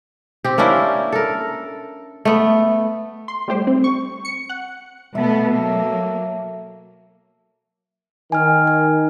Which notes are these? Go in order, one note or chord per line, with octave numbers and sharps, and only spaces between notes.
C4 G4
A#3 C#4 D4 E4
A4 A#4
A3 B3
C6
G3 A3 G4 C5
C4
C#6
C#7
F#5
B2 A3 B3 A4 E5
F#3 A#3
D#3 G#5 F6
G#5